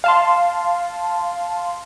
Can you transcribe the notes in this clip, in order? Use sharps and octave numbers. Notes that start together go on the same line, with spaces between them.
F5 A5 C6